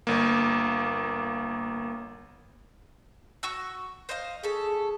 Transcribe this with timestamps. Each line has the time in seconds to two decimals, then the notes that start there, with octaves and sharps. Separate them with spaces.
0.07 G1 A#3
3.43 F#4 C#6 E6
4.09 C5 D#5 F5
4.43 C#4 G#4 A4